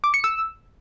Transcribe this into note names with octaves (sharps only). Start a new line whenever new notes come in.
D6
C#7
E6